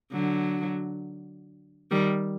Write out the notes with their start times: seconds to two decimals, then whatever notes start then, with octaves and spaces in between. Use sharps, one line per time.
0.12 D3 F#3
1.91 D#3 G3